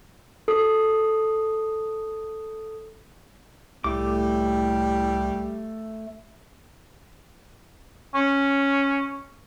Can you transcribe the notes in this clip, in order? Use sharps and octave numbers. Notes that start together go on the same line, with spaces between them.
A4 D#6
C2 A2 G3 A3 D6
C#4